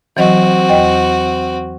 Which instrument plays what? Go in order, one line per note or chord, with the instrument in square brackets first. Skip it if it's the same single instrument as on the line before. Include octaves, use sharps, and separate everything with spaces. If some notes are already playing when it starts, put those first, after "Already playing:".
[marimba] E3 F#3 D#5 [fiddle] C4 F#4
[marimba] E2 D#5 G5